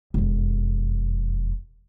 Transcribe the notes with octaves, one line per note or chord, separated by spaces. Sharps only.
E1 F2